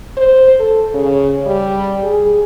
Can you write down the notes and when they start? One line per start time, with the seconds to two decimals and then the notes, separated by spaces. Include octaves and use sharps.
0.17 C5
0.60 A4
0.94 C#3
1.46 G3
2.03 G#4